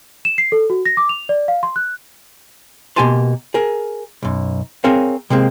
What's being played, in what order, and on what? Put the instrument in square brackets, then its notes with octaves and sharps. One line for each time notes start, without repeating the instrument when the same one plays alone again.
[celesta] E7
C7
A4
F#4
A#6
D6
F7
D5
F5
C6
F#6
[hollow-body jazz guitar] B2 A#3 G4 G#5 A5 C6
G#4 A#4
B1 F#2
C4 G#4 A#4 C#5 F5
C3 G#3 A#3 C4